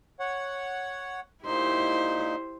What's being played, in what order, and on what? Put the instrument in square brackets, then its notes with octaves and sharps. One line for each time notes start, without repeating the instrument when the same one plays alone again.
[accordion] C#5 F#5
[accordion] A#2 D#4 [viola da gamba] E4 G4 C5